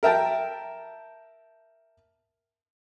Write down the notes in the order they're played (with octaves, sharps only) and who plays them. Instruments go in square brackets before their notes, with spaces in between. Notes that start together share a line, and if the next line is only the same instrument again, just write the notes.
[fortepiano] A#4 E5 G5 A5